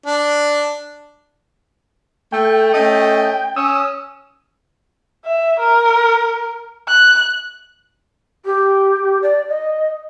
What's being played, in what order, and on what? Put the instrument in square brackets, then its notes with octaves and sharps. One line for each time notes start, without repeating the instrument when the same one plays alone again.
[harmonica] D4
[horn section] A3 [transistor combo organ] G5
[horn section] A3 C#4 D#5
[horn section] C#4 [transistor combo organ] D#6 E6
[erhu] E5
A#4
F#6
[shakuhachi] G4
D5
D#5